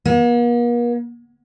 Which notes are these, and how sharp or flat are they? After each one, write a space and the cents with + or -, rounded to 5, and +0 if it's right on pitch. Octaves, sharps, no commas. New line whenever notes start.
A#3 +45